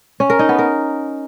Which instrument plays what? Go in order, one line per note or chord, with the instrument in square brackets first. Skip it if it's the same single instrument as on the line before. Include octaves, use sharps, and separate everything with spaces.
[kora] C#4
A#4
D#4
B3
A#4